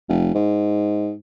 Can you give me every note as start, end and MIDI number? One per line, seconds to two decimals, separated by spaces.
0.09 0.31 29
0.35 1.13 44